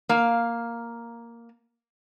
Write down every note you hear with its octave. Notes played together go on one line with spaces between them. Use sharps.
A#3 F5